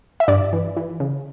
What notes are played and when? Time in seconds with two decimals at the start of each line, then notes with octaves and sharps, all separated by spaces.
0.20 E5
0.28 G2 D5
0.53 E3
0.77 E3
1.00 C#3